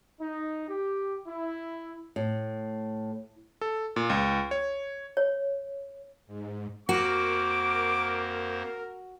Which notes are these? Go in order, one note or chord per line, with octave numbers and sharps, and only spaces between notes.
D#4
G4
E4
A2
A4
A#2
C#2
C#5
C#5
G#2
F2 A#3 F#4 A#4 C5 D6